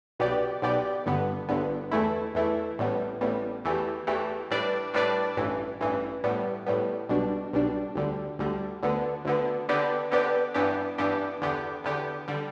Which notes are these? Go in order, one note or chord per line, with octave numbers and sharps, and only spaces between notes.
B1 B2 B3 G4 D5
B1 B2 B3 G4 D5
G1 G2 D3 B3
G1 G2 D3 B3
E2 E3 A3 E4
E2 E3 A3 E4
A1 A2 G3 B3
A1 A2 G3 B3
E2 E3 A3 G4
E2 E3 A3 G4
A2 G3 D4 B4 D5
A2 G3 D4 B4 D5
A1 G2 E3
A1 G2 E3
A2 G3 B3
A2 G3 B3
B1 B2 G3 D4
B1 B2 G3 D4
D2 D3 G3
D2 D3 G3
D2 D3 B3
D2 D3 B3
D3 B3 G4 B4 D5
D3 B3 G4 B4 D5
G2 E3 B3 D4 G4
G2 E3 B3 D4 G4
E2 D3 B3 G4
E2 D3 B3 G4
D3 G3